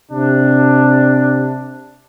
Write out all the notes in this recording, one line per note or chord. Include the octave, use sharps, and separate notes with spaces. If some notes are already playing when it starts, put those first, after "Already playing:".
C3 D4